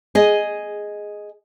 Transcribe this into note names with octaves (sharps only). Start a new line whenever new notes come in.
G#4 D#5